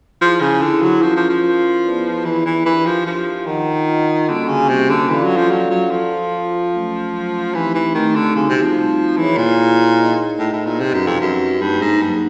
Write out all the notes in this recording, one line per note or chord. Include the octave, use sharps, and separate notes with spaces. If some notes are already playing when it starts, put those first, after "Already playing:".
F3 E4 G#4 C5
C#3
D3 E4 G#4 C5
F#3
F3 C#4 F4 A#4
F3
F3
C#4 F4 A#4
B3 E4 G#4 B4 D5
E3 B3 E4 G#4 B4 D5
E3
E3 D4 G4 A#4
F3
F3 D4 G4 A#4
D#3 F4 A#4 D#5 F#5
F4 A#4 D#5 F#5
D3 G3 A#3 C#4 F#4
C#3
C3 G3 A#3 C#4 F#4
D3
E3 C#4 F4 A4 D5 F5
F#3
F3
F#3 C#4 F4 A4 D5 F5
F#3
F3 F4 A4 C5 F5
F4 A4 C5 F5
F#3 A3 C#4
F#3 A3 C#4
E3 A3 C4 D#4 G4
E3
D#3 A3 C4 D#4 G4
D3
C#3 G3 C4 D#4 F#4
C3
F3
G3 C4 D#4 F#4
E3 E4 G#4 C#5
A#2
E4 G#4 C#5
D#4 G#4 C5 D#5
A2 D#4 G#4 C5 D#5
A2
A#2
C3 C4 D#4 G4 B4
F#2
F2
F#2 C4 D#4 G4 B4
G2 F#3 A#3 D#4
G#2
G2 F#3 A#3 D#4